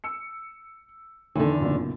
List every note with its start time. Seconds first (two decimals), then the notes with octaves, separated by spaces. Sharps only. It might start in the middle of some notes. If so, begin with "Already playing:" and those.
0.04 E6 C#7
1.35 E2 D3 D#3
1.60 F#1 B1 A#2